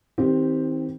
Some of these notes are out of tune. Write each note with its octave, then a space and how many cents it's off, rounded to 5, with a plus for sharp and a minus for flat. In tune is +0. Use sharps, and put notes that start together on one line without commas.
D#3 +35 C4 +0 G4 +0